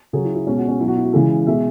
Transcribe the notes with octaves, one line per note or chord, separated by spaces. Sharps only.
C#3 F#3 G#4
E4
E4
B2 G#3 C#4
F#4
C#4
B2 F#3 E4
F#4
E4
F#4
C#3 E3 G#3 E4
B2 G#3 E5